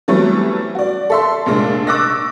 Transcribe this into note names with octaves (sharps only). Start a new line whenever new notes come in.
E3 F#3 G3 A3 B3 C4
F#4 D5
A4 E5 C6
F1 A#2 G#3 D4
C#6 D6 E6 F#6 A6 A#6